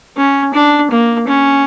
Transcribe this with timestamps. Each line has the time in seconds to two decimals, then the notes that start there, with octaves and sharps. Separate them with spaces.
0.17 C#4
0.54 D4
0.91 A#3
1.28 C#4